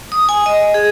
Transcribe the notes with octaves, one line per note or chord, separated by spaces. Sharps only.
D#6
G#5
D#5
G#4